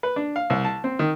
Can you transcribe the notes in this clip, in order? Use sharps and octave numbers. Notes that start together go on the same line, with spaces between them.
B4
D4
F5
C2
A5
C4
D#3